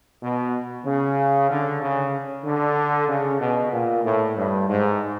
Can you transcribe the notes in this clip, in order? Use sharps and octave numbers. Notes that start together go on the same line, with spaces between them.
B2
C#3
D3
C#3
D3
C#3
B2
A#2
A2
G2
G#2